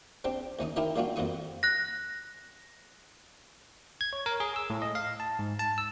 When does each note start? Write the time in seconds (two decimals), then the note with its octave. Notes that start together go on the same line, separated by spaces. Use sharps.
0.24 C4 D4 G4
0.59 D#2 C#4 D#4 D#6
0.76 D#4 E4 G4 A#4 C#5 D#5
0.96 G3 A#3 D4 F4 F#4
1.16 F2 F#3 A#3 F4 C#6 D#6
1.63 F#6 A#6
4.01 G#6
4.13 C#5
4.26 A#4
4.40 G#4
4.56 E6
4.70 A2
4.82 D#5
4.95 F5
5.20 A5
5.39 G#2
5.59 A5
5.78 E6